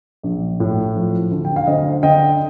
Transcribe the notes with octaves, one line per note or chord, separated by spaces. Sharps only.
A#1
A2
F3
D2
G5
F5
D2 C5 D#5
D3 D#5 G5